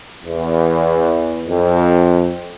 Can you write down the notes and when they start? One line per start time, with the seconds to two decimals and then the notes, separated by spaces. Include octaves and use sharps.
0.24 E2
1.48 F2